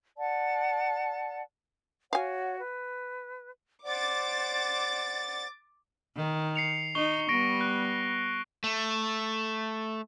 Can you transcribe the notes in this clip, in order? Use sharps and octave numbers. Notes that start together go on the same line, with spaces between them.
D5 F#5 A5
F#4 C#5 F5 F#5 G#5
B4
C5 D5 F#5 D6 A6
D#3
C7 C#7 F7
D#4 C#6 C7 G7
G3 B3 C#6 A#6 D7
F#6
A3